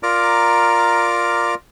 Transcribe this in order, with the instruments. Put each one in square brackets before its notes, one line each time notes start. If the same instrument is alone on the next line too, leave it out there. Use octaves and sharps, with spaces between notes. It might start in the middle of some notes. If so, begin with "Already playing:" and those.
[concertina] F4 A#4 D5 A#5 D6 F6